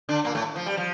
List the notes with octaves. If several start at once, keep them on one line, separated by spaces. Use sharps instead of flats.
D3 D4
A#2 A#3
A2 A3
F3
G3
F3